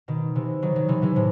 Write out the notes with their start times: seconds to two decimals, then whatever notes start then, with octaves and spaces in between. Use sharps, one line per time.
0.08 B2 D#3
0.36 C3 E3
0.62 D#3 F#3
0.76 D#3 F#3
0.88 C3 E3
1.02 C3 E3
1.16 A2 C3